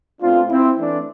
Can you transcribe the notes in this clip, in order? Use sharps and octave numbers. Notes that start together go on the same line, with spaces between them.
B2 A3 C4 D4 F4
C4 E4
E3 A3 C4 D4